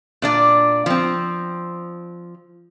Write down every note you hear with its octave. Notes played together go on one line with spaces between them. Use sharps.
A#2 D4 D5
F3 C4